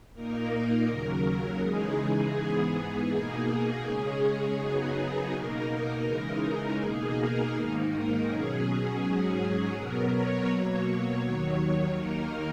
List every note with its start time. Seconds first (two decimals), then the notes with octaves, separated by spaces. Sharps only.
0.14 A#2 A#3 D#4 A#4
0.88 D#2 C#3 F#3
1.62 C#3 E3 G#3 D#4 G#4
2.36 G#2 E3 B3
3.10 B2 A#3 D#4 G#4
3.83 C#3 G#3 C#4
4.57 F#2 C#3 F#3 B3 D#4
5.31 B2 A#3 D#4 A#4
6.05 C#3 E3 G#3 D#4
6.79 B2 A#3 D#4 G#4
7.15 A#4
7.53 G#2 D#3 A#3 D#4
7.89 A#4
8.26 B2 F#3 C#4 G#4
9.00 G#2 F#3 C#4
9.74 B2 F#3 B3 A#4
10.11 C#5
10.48 B2 F#3 A#3 C#5
11.21 D#2 D#3 F#3
11.96 D#2 D#3 A#3 D#4 A#4